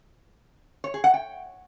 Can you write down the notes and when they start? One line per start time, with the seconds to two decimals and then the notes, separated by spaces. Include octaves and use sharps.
0.84 C#5
0.94 G#4
1.04 F#5
1.14 G5